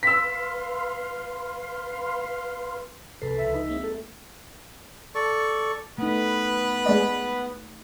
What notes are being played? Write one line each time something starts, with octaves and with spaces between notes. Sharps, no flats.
B4 F5 C6 E6 B6
C2 F2 A4 B4 C7
C#2 F3 E5
D#4
G#3 A#3 C4
A4
A4 D5 C#6
A3 B3 D#4 B4
G#3 D5